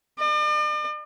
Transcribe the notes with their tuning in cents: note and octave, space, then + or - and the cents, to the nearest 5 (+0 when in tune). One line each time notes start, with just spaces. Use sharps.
D5 +45